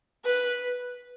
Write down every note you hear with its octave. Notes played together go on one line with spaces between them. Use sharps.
B4